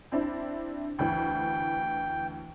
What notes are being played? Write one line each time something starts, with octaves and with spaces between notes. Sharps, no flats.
C4 D4 E4
D2 E3 G5